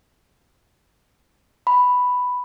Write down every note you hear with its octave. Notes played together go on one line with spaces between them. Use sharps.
B5